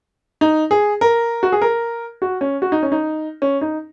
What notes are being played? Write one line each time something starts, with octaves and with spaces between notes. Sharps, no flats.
D#4
G#4
A#4
F#4
G#4
A#4
F#4
C#4
F#4
D#4
C#4
D#4
C#4
D#4